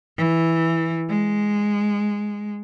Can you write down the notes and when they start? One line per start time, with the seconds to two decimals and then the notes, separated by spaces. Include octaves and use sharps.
0.18 E3
1.09 G#3